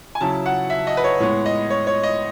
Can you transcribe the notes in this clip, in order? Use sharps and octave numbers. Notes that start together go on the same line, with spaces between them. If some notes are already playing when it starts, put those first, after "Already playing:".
G#5
C#3 F#3 C#4 E4 A5
F#5
E5
D#5
B4
C#5
A2 G#3 B3 C#5
D#5
C#5
C#5
D#5